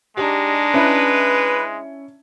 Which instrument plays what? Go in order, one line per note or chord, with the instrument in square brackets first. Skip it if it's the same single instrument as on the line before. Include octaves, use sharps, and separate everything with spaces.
[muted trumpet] G#3 [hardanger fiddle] D4 D#4 [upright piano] G4
[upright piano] C#4 E4 [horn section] B4